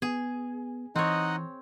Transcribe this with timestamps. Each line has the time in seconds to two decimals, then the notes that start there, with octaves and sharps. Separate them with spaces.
0.02 B3 G#4
0.95 E3 C4 D#4 C#5 D#5 F#5